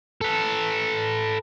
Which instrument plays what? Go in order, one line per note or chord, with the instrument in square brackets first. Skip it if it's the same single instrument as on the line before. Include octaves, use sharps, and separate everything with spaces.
[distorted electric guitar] A4 B4